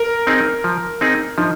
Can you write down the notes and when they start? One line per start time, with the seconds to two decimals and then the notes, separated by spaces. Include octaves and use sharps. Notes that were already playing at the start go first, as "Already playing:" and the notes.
Already playing: A#4
0.27 C4 D#4 G#4
0.64 F3
1.01 C4 D#4 G#4
1.38 F3 D#4